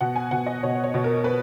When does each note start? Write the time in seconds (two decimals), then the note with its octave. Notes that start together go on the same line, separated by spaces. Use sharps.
0.01 B2 F#5
0.16 G#5
0.31 B2 F#5
0.46 D#5
0.63 B2 C#5
0.84 C#5
0.94 B2
1.04 A#4
1.24 B4